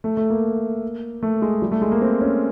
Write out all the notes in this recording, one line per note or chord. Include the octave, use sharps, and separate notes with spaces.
A3
A3
A#3
A3
G#3
G3
A3
G#3
A#3
C4
C#4